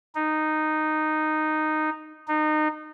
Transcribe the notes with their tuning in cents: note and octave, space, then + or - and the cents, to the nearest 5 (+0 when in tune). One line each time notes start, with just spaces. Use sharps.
D#4 -10
D#4 -25